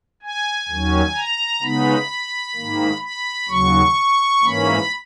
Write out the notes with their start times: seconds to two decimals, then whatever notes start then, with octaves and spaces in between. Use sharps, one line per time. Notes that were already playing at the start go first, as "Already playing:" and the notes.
0.22 G#5
0.69 D#2 D#3 F#3 C#4
1.15 A#5
1.62 C#3 G#3 B3 D#4 B5
2.55 G#2 D#3 A#3
3.02 B5
3.48 D#2 C#3 F#3 C#6
4.43 G#2 E3 A#3 C#4 B5